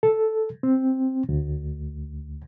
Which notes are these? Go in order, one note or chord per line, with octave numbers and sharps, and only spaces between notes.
A4
C4
D2